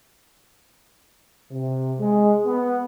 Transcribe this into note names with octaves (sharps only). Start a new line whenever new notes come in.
C3
G#3
B3